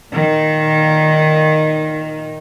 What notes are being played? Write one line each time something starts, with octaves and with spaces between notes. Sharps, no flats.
A#2 D#3